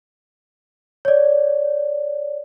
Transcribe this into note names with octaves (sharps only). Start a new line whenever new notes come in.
C#5 D5